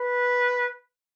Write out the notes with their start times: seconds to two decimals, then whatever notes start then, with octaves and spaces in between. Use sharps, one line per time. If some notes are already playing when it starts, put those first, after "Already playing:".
Already playing: B4